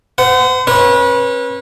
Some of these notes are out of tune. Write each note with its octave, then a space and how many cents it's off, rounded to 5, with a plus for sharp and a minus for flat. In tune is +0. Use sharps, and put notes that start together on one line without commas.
C5 -40 F#5 +5
C#4 -35 B4 -30